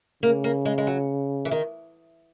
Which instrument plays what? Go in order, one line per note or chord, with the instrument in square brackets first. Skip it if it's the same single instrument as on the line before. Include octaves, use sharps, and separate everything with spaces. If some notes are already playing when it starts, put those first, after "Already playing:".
[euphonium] C#3 [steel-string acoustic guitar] A#3
[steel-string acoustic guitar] A#3
G#3
G#3
F#3
E3
D#3